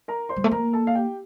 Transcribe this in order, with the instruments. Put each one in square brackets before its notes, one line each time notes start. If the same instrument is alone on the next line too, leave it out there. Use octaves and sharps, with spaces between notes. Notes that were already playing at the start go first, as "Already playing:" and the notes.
[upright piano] A#4 A#5
C5 C6
[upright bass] G3
A3
[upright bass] A#3 [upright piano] A#4 A#5
[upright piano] A4 A5
F5
G4 G5